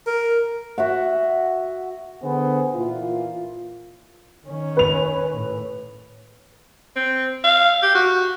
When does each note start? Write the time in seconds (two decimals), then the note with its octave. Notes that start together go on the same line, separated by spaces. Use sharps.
0.07 A#4
0.78 F#4 E5 F#5
2.23 D3 B3 G#4 B4 C5
2.75 A#2 E3 A#3 F4
4.46 D#3 C#4
4.77 B4 F7
5.34 A2
6.96 C4
7.44 F5
7.82 G4
7.95 F#4